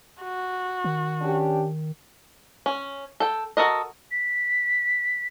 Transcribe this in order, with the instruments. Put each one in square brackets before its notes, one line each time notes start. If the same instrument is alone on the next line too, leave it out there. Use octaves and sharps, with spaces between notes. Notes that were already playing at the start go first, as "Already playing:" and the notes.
[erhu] F#4
[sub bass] D#3
[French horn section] C#4 D4 G4
[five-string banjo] C#4
A4 G5
F#4 A4 A#4 D#5
[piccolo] B6